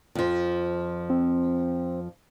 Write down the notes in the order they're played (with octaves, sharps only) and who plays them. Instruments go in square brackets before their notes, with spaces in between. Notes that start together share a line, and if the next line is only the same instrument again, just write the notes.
[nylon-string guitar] F2 F3
[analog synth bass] C4